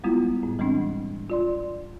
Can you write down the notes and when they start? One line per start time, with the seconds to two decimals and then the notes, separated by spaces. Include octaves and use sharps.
0.04 G3 G#3 B3 E4 F4
0.43 A2
0.59 E3 G3 G#3 C4 D4
1.30 F4 D5 C6